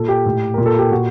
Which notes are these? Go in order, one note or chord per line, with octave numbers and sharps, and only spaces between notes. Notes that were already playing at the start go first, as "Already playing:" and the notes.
Already playing: A#2 A4
G4
A2
A#2 A#4
A4
G4
A#2 F#4